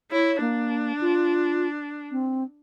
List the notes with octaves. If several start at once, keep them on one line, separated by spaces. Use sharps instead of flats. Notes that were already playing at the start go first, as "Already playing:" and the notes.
E4 C#5
A#3 D4
F4
C4